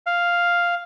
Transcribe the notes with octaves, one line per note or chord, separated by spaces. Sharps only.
F5